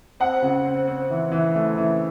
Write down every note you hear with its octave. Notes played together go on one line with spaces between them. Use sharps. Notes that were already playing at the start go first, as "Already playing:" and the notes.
C4 F#5
C#3
C4
C4
E3
E3
A3
E3